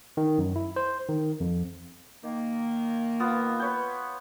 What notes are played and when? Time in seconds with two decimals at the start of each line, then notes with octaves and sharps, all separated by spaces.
0.17 D#3
0.38 F#2
0.56 E4
0.76 C5
1.09 D#3
1.40 F2
2.24 D#3 A#3
3.20 B3 F4
3.59 B4 C#5 G5